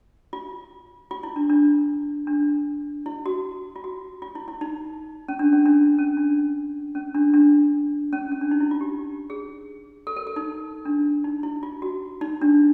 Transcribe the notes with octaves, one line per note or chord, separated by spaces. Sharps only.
F4
F4
E4
D4
D4
D4
E4
F#4
F4
F#4
F4
E4
E4
D#4
C#4
D4
C#4
D4
C#4
D4
C#4
D4
D4
C#4
C#4
D4
D#4
E4
F4
G4
G#4
A4
A#4
A4
D#4
D4
D#4
E4
F4
F#4
D#4
D4